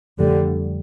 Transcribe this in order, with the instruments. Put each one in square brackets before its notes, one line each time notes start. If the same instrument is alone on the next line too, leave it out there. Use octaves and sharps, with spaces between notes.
[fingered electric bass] F2 F3 A3 [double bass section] D3 G3